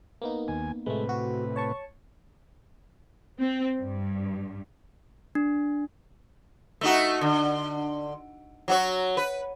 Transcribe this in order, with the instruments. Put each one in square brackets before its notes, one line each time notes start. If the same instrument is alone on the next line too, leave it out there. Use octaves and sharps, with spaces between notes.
[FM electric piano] A#3 B3 D#4
[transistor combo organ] D#2 G#5
[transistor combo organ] A2 C3 B4 [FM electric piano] G#3 A3
[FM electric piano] F#4
C#5 A5 C#6
[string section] C4
G2
[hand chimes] D4
[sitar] A3 D#4 F#4
D3
F#3 F#4 C#5
B4